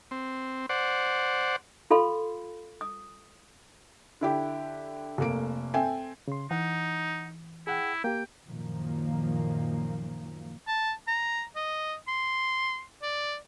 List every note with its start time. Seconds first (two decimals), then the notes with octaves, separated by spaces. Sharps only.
0.11 C4
0.69 C5 D5 F#5
1.90 F4 A4 F5 B5 C6
2.81 D#6
4.21 D3 E4 G4
5.18 F1 A3 A#3 D7
5.74 C4 A4 E5 G5 G#5
6.28 C#3 C6
6.51 E3 D#4 F#5
7.67 E4 G#4 F#5 G5
8.04 A#3 G4 G5
8.47 F#2 A#2 D#3 F3 A#3
10.68 A5
11.08 A#5
11.56 D#5
12.08 C6
13.02 D5